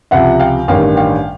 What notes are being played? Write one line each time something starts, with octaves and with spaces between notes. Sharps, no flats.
C#2 C3 F3 E5 F#5
F5 G5
A1 G2 D#3 G3 F5 G5
F5 G5